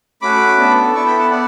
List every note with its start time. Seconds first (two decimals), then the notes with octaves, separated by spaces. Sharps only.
0.22 A3 C#4 F#4 B5 D6
0.58 B3 D4 A4
0.94 B3 E4 A4 A5 C#6
1.06 G5 B5
1.19 F#5 A5
1.31 B3 D5 F#5